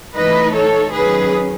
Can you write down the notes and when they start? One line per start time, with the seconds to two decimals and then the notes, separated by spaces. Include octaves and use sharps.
0.15 E3 A3 D#4 B4 D#5
0.54 A4 C#5
0.92 D#3 F#3 C#4 G#4 B4